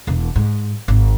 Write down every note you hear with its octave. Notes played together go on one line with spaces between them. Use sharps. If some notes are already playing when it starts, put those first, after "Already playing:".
E1 E3
G#2
G#1